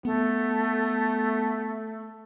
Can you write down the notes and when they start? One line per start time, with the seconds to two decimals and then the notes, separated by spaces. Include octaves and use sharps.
0.05 A3 B3